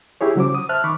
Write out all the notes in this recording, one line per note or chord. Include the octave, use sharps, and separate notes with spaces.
E4 G4 G#4 C#5
C#3 F#3 C5 D6
D#6
C5 E5 A5 F6 F#6
D#3 B5 C#6 D6